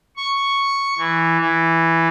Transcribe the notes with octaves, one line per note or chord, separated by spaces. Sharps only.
C#6
E3
E3